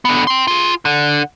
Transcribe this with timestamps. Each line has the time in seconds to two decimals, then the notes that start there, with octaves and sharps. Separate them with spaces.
0.05 D3 B3
0.27 G5 C6
0.47 F4 G#4
0.85 D3